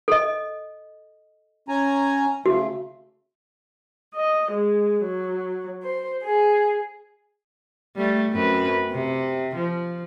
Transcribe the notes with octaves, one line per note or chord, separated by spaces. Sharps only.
A4 D#5
C#4 G#5 A#5
C#3 A3 F#4
D#5
G#3
F#3
C5
G#4
G3 A3
F#2 C4 B4
C3
F3